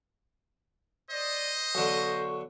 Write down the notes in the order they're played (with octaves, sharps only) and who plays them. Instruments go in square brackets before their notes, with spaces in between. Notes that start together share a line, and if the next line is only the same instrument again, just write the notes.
[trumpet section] C5 D#5 [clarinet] D5
[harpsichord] B1 D3 [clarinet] C#6